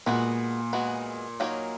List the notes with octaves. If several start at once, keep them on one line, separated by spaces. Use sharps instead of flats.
A#2 G#3 B3 F#4
G#3 B3 F#4
F#3 A#3 D#4 G#4 C#5